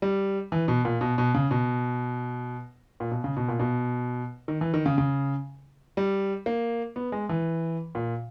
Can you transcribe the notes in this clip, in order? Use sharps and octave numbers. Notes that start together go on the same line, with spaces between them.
G3
E3
B2
A#2
B2
B2
C#3
B2
A#2
B2
C#3
B2
A#2
B2
D#3
E3
D#3
C#3
C#3
G3
A#3
B3
G#3
E3
A#2